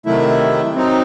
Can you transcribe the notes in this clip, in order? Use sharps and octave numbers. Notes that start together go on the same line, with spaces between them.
C3 D#3 F#3 A3 E4
F#3 C4 D#4